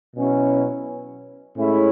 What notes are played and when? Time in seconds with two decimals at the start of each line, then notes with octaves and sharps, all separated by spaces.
0.16 B2 F#3 C#4 E4
1.55 A2 G#3 C#4 E4